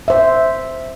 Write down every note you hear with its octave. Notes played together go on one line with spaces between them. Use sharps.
C5 E5